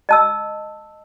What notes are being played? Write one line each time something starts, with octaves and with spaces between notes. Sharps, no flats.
D#5 A5 E6